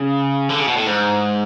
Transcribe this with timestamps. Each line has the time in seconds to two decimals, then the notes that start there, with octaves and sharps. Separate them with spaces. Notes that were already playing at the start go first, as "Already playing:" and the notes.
Already playing: C#3
0.49 D3
0.59 C#3
0.67 B2
0.77 A2
0.86 G#2